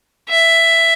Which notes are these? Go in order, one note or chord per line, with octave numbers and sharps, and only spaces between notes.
E5